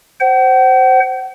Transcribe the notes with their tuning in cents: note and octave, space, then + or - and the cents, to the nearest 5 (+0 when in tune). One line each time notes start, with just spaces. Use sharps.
C5 +0 F#5 +40